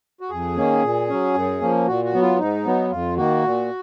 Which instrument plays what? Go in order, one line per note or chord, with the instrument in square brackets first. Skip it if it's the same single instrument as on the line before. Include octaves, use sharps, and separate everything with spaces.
[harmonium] F#4
F2 G#4
D#3 A#3 C#4
A#2
F#3 C#4
F#2
F3 A#3 C#4
A#2 F#4
F#4
F#3 B3
F4
G#2 D#4
F#3 B3
F2 F4
D#3 A#3 F#4
A#2